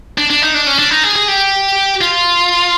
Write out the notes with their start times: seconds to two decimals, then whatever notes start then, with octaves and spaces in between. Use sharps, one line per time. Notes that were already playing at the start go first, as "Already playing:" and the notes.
0.18 D4
0.30 D4
0.42 D#4
0.54 D4
0.67 C#4
0.79 D4
0.91 D#4
1.03 G#4
1.16 G#4
1.28 G4
2.01 F4